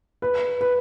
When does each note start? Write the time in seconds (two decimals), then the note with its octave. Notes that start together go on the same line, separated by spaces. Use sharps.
0.22 B4
0.61 B4